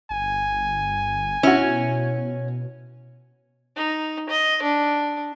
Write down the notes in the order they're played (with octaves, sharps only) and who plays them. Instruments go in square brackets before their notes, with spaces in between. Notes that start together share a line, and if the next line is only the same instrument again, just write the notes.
[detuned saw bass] G1 [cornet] G#5
[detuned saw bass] B2 [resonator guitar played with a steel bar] C#4 [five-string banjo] E4 F#4
[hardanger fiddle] D#4
D#5
D4